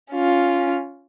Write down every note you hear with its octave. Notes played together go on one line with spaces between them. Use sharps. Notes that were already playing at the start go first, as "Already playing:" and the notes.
C#4 F4